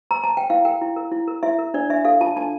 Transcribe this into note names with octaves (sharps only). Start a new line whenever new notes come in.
A#5
A5
G5
E4 F5
A#4 G5
E4
A#4
E4
A#4
E4 E5
A#4
D4 D5
D4 E5
A4 F5
F4 A5
D4 A5